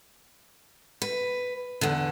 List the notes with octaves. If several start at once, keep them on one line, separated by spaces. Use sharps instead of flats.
B4
E2 D3